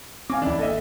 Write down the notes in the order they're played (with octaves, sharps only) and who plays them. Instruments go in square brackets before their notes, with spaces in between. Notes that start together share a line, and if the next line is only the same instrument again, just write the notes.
[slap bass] C4 [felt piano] F5 G#5 D6
[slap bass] D#2 E3 [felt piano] D4 E4
[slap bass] G#1 A#3 D4 [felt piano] A4 D#5 E5